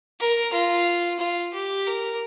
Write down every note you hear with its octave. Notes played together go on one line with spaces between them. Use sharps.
A#4
F4
F4
G4
A#4